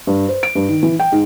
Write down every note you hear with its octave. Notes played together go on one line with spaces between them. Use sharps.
G2
C5
D7
G2
D#3
E3
G5
G#2